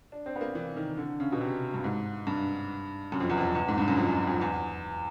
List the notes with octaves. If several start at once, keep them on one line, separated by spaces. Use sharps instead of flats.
D4
C4
B3
A#3
E3
D#3
D3
C#3
B2
C3
G2
G#2
G2
F#2
F2
E2
F2
E2
G#2
G2
F#2
F2
F#2
F2
E2